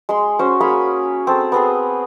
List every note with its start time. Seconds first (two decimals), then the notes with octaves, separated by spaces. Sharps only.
0.09 G#3 C6
0.39 C#4 F#4 C5
0.61 A#3 G#4 C#5 B5
1.27 C4 A4
1.52 B3 C4 G#4